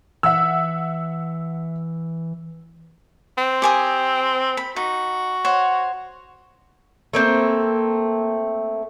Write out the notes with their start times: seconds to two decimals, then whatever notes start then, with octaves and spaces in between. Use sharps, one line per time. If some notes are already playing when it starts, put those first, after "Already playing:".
0.23 E3 E5 F#5 E6
3.38 C4
3.62 G4 G#5 D#6
4.57 B5
4.76 D#4 F#4
5.45 C5 C#5 F#5
7.13 A3 A#3 C4